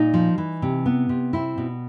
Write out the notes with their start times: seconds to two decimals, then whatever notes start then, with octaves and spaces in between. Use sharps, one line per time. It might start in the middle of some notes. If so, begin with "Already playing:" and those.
Already playing: A#2 D#4
0.14 F3
0.38 E3
0.62 C3
0.86 B3
1.09 C3
1.33 C4 E4
1.58 B2